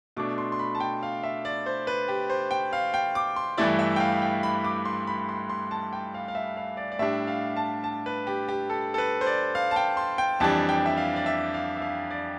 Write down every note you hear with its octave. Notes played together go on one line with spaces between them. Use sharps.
B2 A3 D4 D6
C6
C6
B5
A5
G5
F5
E5
D5
C5
B4
G4
C5
G5
F5
G5
D6
C6
G2 E3 A3 E4 D5
E5
G5
F5
G5
B5
D6
C6
B5
C6
C6
A5
G5
F5
F5
E5
F5
D5
D5
A2 G3 D4 E5
F5
A5
A5
B4
G4
G4
A4
A4
B4
C5
D5
F5
A5
G5
C6
G5
F2 E3 G3 D4 A5
G5
E5
F5
D5
E5
F5
E5
F5
D5